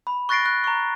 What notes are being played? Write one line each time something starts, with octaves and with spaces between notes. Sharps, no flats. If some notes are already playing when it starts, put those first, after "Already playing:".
B5
C#6 F#6 A6 A#6 C7 D7
F#6
A#5 C#6